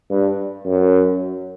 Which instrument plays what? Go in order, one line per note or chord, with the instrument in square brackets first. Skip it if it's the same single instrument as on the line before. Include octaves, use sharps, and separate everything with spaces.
[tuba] G2
F#2